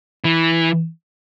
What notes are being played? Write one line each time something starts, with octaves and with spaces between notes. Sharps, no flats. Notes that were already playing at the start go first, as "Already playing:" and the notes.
E3